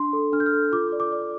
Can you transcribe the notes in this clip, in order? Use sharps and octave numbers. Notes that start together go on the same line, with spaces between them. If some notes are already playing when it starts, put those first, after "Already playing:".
Already playing: D4 C6
A4
D4 F6
G6
F6
A4
F4 D6
D5
D6
D5